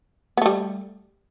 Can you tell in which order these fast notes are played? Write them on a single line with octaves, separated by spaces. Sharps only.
B3 A3 G3